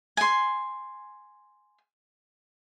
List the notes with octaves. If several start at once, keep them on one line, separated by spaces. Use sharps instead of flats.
G#5 C6